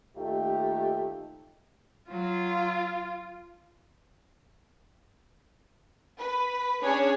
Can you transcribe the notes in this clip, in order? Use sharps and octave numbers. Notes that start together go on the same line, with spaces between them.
D#2 A3 D#4 F4 G4
F#3 F4
B4
C#4 D4 G#4 C#5